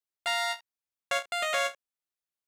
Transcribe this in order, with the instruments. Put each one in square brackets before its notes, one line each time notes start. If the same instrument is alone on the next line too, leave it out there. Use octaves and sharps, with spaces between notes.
[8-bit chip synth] F5 A#5
C#5 F5
F5
D#5
C#5 F5